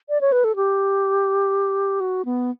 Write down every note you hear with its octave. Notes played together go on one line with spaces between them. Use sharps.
D5
C#5
B4
A4
G4
F#4
B3